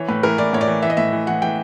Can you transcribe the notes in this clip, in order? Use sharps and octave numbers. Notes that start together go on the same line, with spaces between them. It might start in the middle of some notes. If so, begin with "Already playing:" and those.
Already playing: E3 C#5
A2 B4
E3 A#4
E3 D5
A2 C#5
D5
E3
E3 E5
D#5
A2 E5
E3
E3 F#5
E3 G5